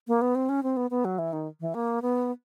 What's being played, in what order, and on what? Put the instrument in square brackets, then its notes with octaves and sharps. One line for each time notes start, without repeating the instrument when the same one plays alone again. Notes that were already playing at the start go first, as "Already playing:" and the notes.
[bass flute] A#3
B3
C4
C#4
C4
B3
B3
F#3
E3
D#3
E3
A#3
B3